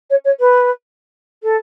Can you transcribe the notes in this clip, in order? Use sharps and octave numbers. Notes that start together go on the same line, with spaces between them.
C#5
C#5
B4
A4